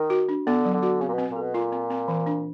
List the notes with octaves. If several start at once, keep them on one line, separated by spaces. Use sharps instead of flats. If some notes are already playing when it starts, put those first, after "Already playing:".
Already playing: D#3
F#4
D4
D3 B3
F#3
D3
F#4
C#3 C4
A#2
B2
C4
A#2
A4
B2
A#2 F4
C4
C4
E3
D4